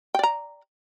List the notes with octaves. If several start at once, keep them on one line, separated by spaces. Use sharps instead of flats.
D5 G5 A#5